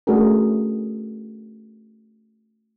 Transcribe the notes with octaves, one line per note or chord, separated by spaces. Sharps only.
A3 C#4 D4 F#4 G#4 A#4